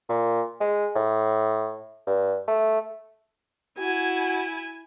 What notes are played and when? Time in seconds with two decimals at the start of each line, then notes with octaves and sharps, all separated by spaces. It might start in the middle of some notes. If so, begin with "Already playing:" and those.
0.09 A#2
0.61 G#3
0.95 A2
2.07 G2
2.48 A3
3.78 E4 F#4 G#5